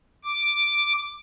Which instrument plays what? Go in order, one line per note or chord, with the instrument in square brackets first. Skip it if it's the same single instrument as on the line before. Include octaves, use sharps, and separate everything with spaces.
[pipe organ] D6